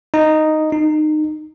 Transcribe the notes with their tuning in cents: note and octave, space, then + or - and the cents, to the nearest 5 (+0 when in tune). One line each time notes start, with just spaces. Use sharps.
D#4 -5
D#4 -25